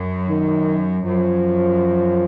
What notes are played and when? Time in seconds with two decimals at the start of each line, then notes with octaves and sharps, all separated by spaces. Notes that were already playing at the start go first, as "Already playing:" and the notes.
Already playing: F#2
0.29 D#3
1.05 F#2 F3